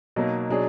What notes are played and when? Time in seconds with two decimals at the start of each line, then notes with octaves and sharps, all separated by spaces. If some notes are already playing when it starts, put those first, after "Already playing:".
0.16 B2 F#3 A#3 D#4
0.49 B2 F#3 D4 G#4